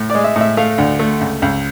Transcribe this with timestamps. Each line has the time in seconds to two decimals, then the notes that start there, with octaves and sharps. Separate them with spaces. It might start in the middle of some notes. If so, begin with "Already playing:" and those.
Already playing: A2
0.10 D5
0.15 G#3
0.24 E5
0.36 A2 E5
0.57 A3 F5
0.78 D2
0.99 A3
1.21 C#2
1.42 C#2